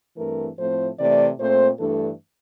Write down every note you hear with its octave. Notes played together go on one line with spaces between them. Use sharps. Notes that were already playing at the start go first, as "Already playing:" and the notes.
G2 E3 A3 C4 A#4
A2 F3 A3 C4 C5
C3 E3 A3 D5
A#2 A3 C4 C5
G2 E3 A3 D4 A4